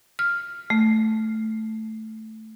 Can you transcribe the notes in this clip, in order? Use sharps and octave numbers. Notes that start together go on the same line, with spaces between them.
F6
A3